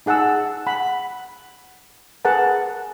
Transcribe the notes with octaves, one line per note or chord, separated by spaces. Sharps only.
D#4 G#4 F#5 A5 E6
F#5 B5
G#4 A#4 B4 F#5 A5